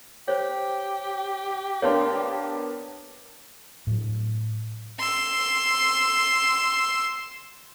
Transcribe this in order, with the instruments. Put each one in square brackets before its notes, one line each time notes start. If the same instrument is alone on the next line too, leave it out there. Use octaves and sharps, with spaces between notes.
[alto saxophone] G4 [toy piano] C5 C#5
[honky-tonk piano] A#3 B3 D4 [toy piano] C#5 F5 C6
[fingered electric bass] A2 F#3
[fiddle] C6 E6